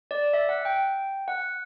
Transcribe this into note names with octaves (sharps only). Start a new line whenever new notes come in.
D5
E5
F#5
G5
F#5